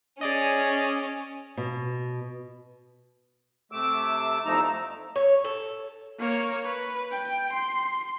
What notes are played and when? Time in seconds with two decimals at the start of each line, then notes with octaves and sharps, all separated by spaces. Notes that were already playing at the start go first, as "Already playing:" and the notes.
0.21 C#4 G#4 D5 D#5
1.57 B2
3.72 C3 A3 D6 E6
4.45 E2 F3 A3 D#4 A#5 E6
5.16 C#5
5.44 A4
6.19 A#3 C#5
6.65 B4
7.12 G5
7.53 C6